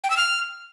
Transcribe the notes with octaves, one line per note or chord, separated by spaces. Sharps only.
G5
E6
F6